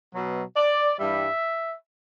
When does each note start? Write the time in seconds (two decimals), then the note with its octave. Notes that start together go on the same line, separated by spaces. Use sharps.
0.13 B2 F#3
0.57 D5
0.99 G2 E3 G3 E5